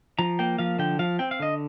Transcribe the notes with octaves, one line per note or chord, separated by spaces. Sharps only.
F3 A#5
A#3 G5
F3 F5
D3 G5
F3 F5
C4 G5
F5
D3 D#5